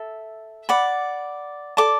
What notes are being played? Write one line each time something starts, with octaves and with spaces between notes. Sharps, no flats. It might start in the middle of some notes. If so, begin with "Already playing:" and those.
Already playing: A4 E5
D5 F#5 B5
A4 D5 A5 D6